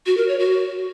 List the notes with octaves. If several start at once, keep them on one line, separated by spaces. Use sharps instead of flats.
F#4
A#4
C#5
F#4